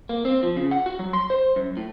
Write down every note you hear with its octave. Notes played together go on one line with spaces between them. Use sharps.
A#3
C4
F3
C#3
F#5
F#4
F#3
C6
C5
F#2
A2